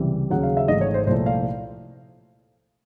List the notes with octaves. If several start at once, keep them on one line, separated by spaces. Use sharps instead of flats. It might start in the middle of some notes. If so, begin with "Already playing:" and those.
Already playing: C#2 C3 E3 G3
D#2 C#3 F#3 F#5
F5
E5
G#1 G#2 E3 A3 D#5
C#5
C5
C2 A#2 F3 A3 C5
F5